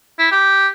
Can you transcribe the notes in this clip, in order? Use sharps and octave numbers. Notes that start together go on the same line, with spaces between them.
E4
G4